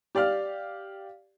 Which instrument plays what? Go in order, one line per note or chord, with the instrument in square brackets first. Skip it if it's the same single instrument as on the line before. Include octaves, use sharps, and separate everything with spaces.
[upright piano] G4 D5 F5 F6